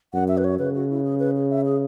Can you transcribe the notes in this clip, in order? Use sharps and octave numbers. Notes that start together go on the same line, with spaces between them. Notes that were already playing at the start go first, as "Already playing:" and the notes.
F#2 F#5
E5
B4
C#5
C#3 B4
F#4
E4
G#4
B4
G#4
E5
G#4